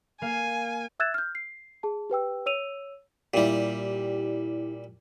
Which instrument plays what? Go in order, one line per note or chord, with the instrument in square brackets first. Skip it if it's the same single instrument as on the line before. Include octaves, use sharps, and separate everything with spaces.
[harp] A#3 F5 [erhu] G#5
[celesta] E5 E6 F#6 G#6 A6 E7
F6 G6
C7
G#4 A5
G4 B4 G5 E6
C#5 E6 D#7 F7
[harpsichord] A#2 G3 [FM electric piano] E4 G4